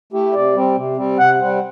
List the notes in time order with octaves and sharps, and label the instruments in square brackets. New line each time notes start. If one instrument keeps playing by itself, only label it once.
[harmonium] A3 E4 G4
[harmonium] C3 [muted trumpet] D5
[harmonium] G3 C4
C3
G3 C4
[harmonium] C3 [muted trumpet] F#5
[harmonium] G3 C4